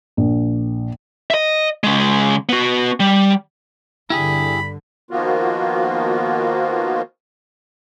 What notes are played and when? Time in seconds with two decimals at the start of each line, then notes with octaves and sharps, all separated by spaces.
0.17 A#1
1.30 D#5 E5
1.84 C#3 G#3
2.49 B3 F#4
3.00 G3
4.10 G2 D3 E4 G4 G#4 B5
5.11 D#3 F3 A#3 B3 F4 F#4